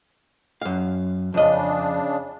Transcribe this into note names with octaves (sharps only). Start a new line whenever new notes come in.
F#2 F5
F2 C#3 D4 D#5